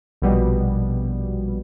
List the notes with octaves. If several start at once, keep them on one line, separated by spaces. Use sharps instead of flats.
A#1 B2 G3